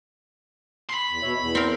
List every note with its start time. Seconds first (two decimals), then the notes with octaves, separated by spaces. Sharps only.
0.90 B5 C6
1.09 E2
1.22 B2 C#5 E5
1.39 E2
1.55 C4 A#4